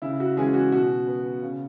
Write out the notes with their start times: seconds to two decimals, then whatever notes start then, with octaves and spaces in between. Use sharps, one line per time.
0.02 C#3 E4
0.20 F#4
0.37 E3 G#3 C#4 G#4
0.54 F#4
0.72 B2 F#4
1.07 B3
1.42 C#3